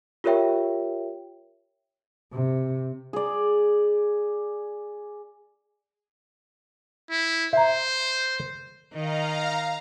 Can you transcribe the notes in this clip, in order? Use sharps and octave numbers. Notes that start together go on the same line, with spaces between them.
F4 G4 A#4 C#5 E5 G5
C3
G#4 D5
E4
C5 E5 A#5
D#3 D#5 F5 A#5